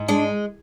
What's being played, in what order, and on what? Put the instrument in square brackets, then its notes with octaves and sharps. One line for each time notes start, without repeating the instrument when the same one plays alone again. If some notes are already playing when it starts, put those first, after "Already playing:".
Already playing: [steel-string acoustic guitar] G#2
[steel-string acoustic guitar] G#3 [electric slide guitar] D4